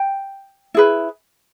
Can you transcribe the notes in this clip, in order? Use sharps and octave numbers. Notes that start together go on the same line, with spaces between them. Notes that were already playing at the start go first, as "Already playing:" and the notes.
Already playing: G5
E4 G#4 B4